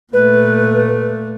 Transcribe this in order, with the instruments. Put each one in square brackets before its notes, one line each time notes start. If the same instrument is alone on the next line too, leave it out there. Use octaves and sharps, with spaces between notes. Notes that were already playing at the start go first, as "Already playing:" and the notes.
[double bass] A#2 A3 [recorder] B4